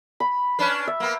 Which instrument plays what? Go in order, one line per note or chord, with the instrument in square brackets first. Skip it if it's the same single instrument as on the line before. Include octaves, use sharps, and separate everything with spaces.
[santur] B5
[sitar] C#4 D4 B4
[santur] E5
[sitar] A#3 B3